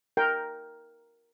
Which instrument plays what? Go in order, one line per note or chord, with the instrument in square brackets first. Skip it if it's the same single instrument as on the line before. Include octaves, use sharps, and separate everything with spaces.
[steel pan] A#4 G5